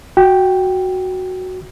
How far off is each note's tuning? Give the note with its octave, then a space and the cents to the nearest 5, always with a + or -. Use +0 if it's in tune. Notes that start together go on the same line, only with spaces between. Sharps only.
F#4 +0 G5 +0